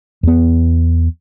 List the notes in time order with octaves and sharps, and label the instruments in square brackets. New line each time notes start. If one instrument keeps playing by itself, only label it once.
[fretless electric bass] E2 B3